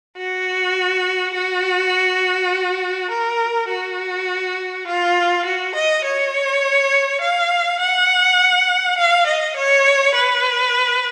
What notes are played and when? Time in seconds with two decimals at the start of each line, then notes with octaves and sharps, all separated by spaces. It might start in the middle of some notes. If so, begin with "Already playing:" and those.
0.17 F#4
1.34 F#4
3.11 A#4
3.69 F#4
4.87 F4
5.45 F#4
5.75 D#5
6.04 C#5
7.21 F5
7.80 F#5
8.98 F5
9.27 D#5
9.56 C#5
10.15 B4